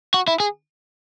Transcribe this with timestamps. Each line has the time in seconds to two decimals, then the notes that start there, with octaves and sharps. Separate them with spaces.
0.14 F#4
0.28 E4
0.40 G#4